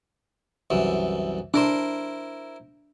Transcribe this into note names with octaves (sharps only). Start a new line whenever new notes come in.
C2 F#2 E3
D4 E4 A#4 C5